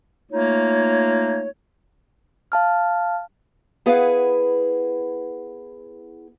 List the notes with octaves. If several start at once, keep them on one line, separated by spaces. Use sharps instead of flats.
A3 A#3 D#4 F4 C#5
F5 A5 F6
B3 E4 G#4 B4 F5 F#5